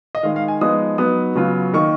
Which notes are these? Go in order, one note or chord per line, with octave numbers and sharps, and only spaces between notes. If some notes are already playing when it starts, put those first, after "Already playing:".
D#5
D#3 G#3 D#4 F5
F5
G#5
F3 G#3 B3 D#4 D#6
F#3 B3 D#4 D#6
C#3 F#3 B3 F4
D#3 A#3 D#4 C#6